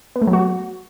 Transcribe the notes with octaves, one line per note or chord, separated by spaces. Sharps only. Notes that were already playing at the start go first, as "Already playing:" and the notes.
B3
A3
F#3
F#4